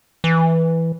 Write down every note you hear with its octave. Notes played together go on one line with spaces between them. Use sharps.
E3